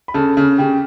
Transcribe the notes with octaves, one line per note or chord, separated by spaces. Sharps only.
B5
C#3 A4 A5
C#3
C#3 G4 G5